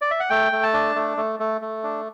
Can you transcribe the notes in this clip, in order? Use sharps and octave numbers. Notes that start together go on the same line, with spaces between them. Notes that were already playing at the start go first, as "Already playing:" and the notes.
D5
E5
F#5
A3 G5
A3
A5
D4
A3
A3
A3
A3
D4